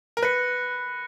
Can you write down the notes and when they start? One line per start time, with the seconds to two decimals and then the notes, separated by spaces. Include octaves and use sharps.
0.17 A#4
0.23 B4 F#6 A#6 C#7